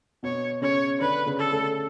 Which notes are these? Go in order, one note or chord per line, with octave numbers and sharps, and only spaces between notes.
B2 B3 C#5
C#3 C#4 C#5
D3 D4 B4
C#3 C#4
A4
A3